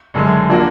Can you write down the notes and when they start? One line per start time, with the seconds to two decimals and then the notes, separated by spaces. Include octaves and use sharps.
0.14 F#1 F#2 D3 G#3
0.49 F3 A#3 D4 F#4